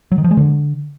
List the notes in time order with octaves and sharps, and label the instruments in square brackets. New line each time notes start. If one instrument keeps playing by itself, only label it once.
[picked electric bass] F#3
D#3
F3
G#3
D3